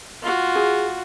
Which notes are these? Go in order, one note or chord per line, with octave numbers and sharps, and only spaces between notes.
F4 F#4
G#4